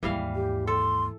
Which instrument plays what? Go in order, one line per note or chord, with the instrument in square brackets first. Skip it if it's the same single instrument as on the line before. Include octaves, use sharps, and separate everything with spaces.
[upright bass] D#2 G#2 [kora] E3 G3 F5
[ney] G4
[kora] A4 [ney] C6